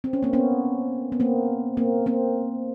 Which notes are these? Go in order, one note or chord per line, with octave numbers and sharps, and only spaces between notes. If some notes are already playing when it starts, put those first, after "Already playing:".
C4
C#4
A#3 C4
B3 C#4
B3
A#3 C4
A#3 C4
A#3 C4